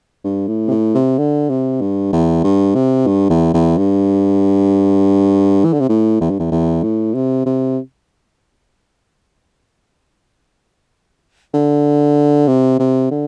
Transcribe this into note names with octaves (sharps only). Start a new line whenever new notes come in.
G2
A2
C3
A2
C3
D3
C3
G2
E2
G2
C3
G2
E2
E2
G2
E3
D3
C3
A2
E2
G2
E2
E2
A2
C3
C3
D3
C3
C3
D3